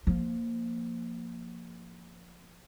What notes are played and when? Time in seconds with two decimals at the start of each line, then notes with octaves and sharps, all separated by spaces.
0.07 F3 A#3